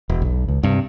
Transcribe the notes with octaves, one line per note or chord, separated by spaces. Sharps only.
E1
B1
C#2
G2 C3